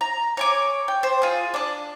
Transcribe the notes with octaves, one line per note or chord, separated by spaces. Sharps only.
A#5
C#5 G#5 D6
G5
C5
F4 G#4
D4 F#6